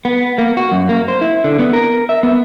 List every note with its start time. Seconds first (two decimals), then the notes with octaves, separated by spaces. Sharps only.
0.05 B3
0.38 A#3
0.57 F#4
0.72 F#2
0.89 A#3
1.08 C5
1.21 E4
1.44 D3
1.59 B3
1.73 A#4
2.09 E5
2.23 B3